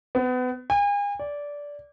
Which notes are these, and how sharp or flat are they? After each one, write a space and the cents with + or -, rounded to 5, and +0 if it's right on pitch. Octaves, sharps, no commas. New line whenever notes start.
B3 +30
G#5 -40
D5 -15